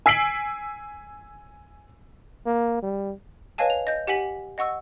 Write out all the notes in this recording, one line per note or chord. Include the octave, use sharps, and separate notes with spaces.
G#5 E6 B6 C7 D7 F#7
A#3
G3
B4 C#5 D#5 F5 G#5 A5
F7
D#5 G6
G4 F#5 G#5 B6 F#7
D#5 F#5 C#6 E6